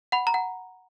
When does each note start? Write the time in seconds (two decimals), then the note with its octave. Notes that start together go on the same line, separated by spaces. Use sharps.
0.12 F#5 B5
0.27 A#5
0.34 F#5